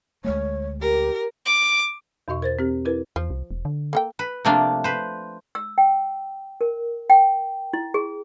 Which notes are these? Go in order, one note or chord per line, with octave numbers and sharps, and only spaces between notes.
D2 G#3 A3 C#5
G4 A#4
D6
E2 B2 F#4 D#5 C#6
A#4 C5 A6
C4 G4
E4 A#4 B4
E2 F3
C2
E1
D3
A#3 A4 G5
B4
C3 F3 A3 A#3 D4
B4 C5
E6
G5
A#4
G5
E4
G#4